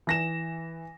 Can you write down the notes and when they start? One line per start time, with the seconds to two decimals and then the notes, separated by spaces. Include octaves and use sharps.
0.07 E3 A#6 E7